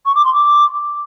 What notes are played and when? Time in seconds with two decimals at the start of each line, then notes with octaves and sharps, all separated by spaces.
0.06 C#6
0.15 D6
0.25 C6
0.34 D6